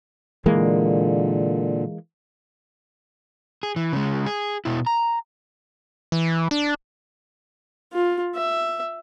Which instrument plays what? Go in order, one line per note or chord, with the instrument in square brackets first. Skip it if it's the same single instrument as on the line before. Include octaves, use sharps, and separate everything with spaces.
[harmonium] A#2 D3 [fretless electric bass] E3 G#3 A#3
[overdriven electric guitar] G#4
E3
C#3 G#3
G#4
B2 E4
A#5
[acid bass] E3
D4
[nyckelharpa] F4
E5